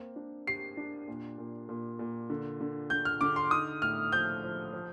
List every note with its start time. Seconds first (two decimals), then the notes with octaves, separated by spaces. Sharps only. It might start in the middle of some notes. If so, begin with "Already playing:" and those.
Already playing: A#3 C4
0.16 D4
0.47 G4 C7
0.77 D4
1.08 A#2
1.38 A#2
1.69 A#2
1.99 A#2
2.30 D3
2.61 D3
2.90 D3 G6
3.05 F6
3.21 D3 D6
3.36 C6
3.51 D#4 D#6
3.82 A2 F6
4.12 F3 G6
4.44 F3
4.73 F3